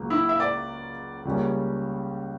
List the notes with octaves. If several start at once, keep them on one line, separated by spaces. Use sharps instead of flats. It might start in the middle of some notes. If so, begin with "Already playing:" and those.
Already playing: C#2 C#3 F#3 A#3
E4
E5
D5
C#2 C#3 G3 A#3 C#4